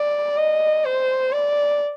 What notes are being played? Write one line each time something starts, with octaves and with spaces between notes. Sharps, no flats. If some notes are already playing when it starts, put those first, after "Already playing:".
Already playing: D5
D#5
C5
D5